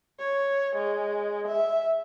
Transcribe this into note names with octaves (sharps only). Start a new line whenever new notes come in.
C#5
G#3
E5